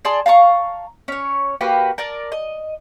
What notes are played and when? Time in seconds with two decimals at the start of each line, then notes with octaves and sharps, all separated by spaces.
0.05 G#4 D5 A5 C6
0.26 F5 A5 A#5 C#6
1.08 C#4 C#5
1.61 A#3 F#4 G4 B4
1.98 A#4 D5 A5
2.32 D#5